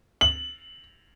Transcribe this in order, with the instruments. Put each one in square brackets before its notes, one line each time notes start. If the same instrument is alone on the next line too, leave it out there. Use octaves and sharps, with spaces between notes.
[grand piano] F#7